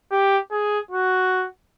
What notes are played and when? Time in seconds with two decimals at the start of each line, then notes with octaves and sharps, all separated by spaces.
0.11 G4
0.51 G#4
0.91 F#4